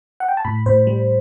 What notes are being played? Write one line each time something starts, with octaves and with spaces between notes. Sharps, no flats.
F#5
G5
A5
A2 B5
A2 C5
G3